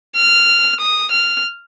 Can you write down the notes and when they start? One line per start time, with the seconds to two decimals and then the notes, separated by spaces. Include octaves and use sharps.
0.16 F6
0.80 D#6
1.11 F6